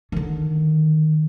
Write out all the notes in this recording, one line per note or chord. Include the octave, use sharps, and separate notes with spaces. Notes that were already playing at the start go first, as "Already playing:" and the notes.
D3 D#3